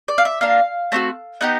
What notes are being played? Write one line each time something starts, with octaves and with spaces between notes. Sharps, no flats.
D5
F5
E5
A#3 D4 F4 F5
A3 C4 D#4 F#4
B3 D#4 G4 F#5